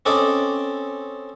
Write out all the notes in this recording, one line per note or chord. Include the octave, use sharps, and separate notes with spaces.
C4 C#4 A4 D5 D#5